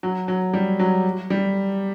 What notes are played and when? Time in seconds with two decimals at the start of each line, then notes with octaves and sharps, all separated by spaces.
0.03 F#3
0.28 F#3
0.54 G3
0.80 F#3
1.30 G3